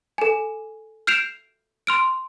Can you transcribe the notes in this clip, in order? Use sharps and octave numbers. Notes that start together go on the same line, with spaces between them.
A4 G#5
F6 G6 C7 D7 E7 F7
C6 F6 D7